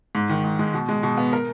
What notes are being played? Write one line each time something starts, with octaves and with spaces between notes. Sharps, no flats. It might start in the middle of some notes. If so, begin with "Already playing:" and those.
G#2
D#3
G#2
G#3
B2
G#3
B2
B3
A#4